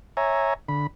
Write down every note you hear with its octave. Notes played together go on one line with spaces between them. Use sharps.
C#5 E5 G#5 A#5
D3 B5